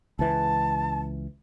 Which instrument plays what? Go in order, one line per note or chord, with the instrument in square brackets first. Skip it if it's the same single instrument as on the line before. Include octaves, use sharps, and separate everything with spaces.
[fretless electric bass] C#2 E3 [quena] A5